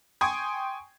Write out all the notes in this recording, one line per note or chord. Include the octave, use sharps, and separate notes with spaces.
G5 G#5 C6 C#6 D#6 G#6